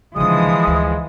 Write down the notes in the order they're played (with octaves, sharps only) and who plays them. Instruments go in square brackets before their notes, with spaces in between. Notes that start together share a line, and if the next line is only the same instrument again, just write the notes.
[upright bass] C#2 D3 [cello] E3 F3 [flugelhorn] G#3 [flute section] D#6
[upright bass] D2